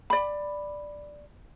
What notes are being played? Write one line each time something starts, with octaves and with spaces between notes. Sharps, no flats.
D5 B5